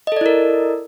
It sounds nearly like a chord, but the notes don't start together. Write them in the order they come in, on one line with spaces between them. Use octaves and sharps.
D#5 A4 D5 E4 A#4